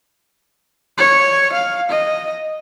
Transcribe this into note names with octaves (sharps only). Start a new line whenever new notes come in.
C#5
F5
D#5